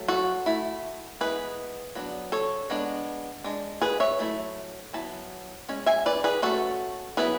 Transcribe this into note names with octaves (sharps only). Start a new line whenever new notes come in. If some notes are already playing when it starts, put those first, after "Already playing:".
Already playing: F#3 A3
F#4 A4
A3 E4
G#3 B3 E4 G#4 B4
F#3 B3 D4
A4 C#5
G#3 B3 D4
G#3 D4
G#4 B4
C#5 E5
F#3 A3 E4
F#3 B3 E4 A5
G#3 C#4
E5 G#5
B4 D5
G#4 B4
F#3 A3 C#4 F#4 A4
F#3 B3 E4 G#4 B4